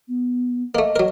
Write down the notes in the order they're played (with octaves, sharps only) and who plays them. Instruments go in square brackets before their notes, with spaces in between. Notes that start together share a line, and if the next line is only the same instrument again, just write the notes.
[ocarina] B3
[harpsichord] A3 A#3 [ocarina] D#5
[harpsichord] F#3 A#4